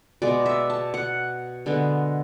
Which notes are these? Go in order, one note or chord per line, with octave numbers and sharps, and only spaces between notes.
B2 G#3 B3 D5
E5
A5
F#5
D3 G#3 B3